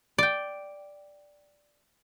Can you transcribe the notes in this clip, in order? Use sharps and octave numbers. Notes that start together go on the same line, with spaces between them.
D5 G5